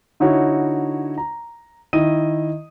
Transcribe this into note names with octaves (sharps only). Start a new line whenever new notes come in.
D3 D#4 E4 F#4 C#5
A#5
D#3 E4 D#5 D#6 D#7